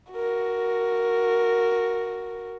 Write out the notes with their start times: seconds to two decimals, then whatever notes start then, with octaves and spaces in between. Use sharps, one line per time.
0.12 F#4 A#4